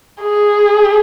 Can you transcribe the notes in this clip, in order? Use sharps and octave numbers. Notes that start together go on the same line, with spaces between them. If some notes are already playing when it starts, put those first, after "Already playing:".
G#4